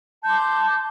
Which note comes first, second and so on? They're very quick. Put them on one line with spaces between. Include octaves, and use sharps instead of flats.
A5 G6 C6 D6